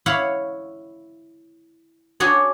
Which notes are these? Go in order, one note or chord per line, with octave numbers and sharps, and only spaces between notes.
E4 C#5 F5 F#5
D4 F#4 G#4 C#5